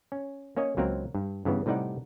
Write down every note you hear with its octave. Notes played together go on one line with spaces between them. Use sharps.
C#4
A#3 C#4 C#5 D#5
C#2 F#3 A#3 C4 A#4
G2
G2 C#3 E3 B3
A2 C3 G3 D#4 D5 F#5